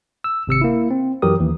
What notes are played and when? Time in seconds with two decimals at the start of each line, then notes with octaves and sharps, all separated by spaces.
0.24 E6
0.47 G#1 C3 E6 C#7
0.61 A#3 E4
0.91 C4
1.22 F#2 E3 F#3 G4 A#4 D#6
1.40 D#2 E3